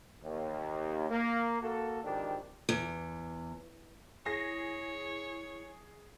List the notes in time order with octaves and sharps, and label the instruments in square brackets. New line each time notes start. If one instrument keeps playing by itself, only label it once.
[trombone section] D#2
A#3
A#3 F#4 A4
G#1 F2 D#3 D4 G4
[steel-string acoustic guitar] E2
[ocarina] E4 [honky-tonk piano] G#4 A#6 C7 [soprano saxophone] C#5